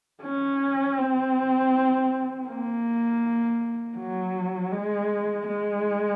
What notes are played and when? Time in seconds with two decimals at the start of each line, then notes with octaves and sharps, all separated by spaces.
0.22 C#4
0.98 C4
2.48 A#3
3.97 F#3
4.72 G#3
5.47 G#3